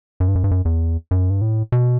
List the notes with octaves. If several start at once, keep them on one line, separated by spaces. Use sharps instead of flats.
F#2
G2
F#2
G2
F#2
E2
F#2
G2
A2
B2